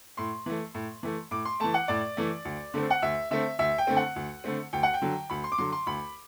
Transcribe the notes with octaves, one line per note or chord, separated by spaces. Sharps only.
A2 C6
E3 A3
A2
E3 A3
A2 D6
C6
E3 A3 A5
F#5
A2 D5
E3 A3
D2
D3 A3 C4
F#5
D2 E5
D3 A3 C4 E5
D2 E5
G5
D3 A3 C4
F#5
D2
D3 A3 C4
D2 G5
F#5
G5
D3 F#3
D2 B5
C6
D6
D3 F#3 C6
C6
D2 B5